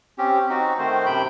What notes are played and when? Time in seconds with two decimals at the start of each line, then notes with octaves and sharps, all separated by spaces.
0.18 C4 C#4 G4
0.50 C4 D#4 F#4
0.79 D#3 A3 C5
1.06 F#2 C3 G5 B5 G6